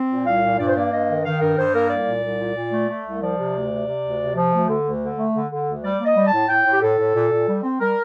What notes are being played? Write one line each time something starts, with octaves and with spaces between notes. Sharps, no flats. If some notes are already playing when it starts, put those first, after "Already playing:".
Already playing: C4
A#2
C2 F5
A#2
G2 D5
C5
A#3 D5
G2 D#5
D#3
D#3 F5
G2 A#4
G2 C5
A#3 A#4
C2 D5
A#2
C2
A#2
A#2
A3
A3
C2
F3 D5
C3
D2
C3
C3
D2
C3
F3
D2
D3
D2
D3
A3
D3
D3
D2
G3 D5
A#3
D#5
G3
A5
A2
A2 G5
A2
G4
A2 A4
A2
A#2
A#2
G3
C4
G3 A#4